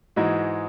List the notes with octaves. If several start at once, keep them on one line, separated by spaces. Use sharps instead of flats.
G#2 E3 G#3 D#4 F#4